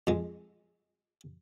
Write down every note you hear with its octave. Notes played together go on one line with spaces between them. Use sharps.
F2 G#3